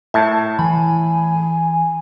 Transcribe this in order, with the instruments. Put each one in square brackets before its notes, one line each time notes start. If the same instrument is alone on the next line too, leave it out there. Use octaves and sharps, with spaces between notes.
[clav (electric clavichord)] A2 [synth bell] E5 A5
[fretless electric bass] E3 [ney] G#5 [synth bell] B5